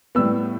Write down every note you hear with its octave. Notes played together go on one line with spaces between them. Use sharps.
A2 G3 B3 E6